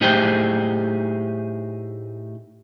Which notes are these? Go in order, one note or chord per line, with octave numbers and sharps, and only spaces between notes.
A2 D#4 G4 G#4 C5 G5